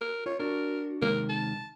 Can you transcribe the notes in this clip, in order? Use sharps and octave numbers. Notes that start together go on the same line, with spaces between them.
A#4
F4 C#5
D4 F#4 A#4
C3 D#3 G#3 A#4
A5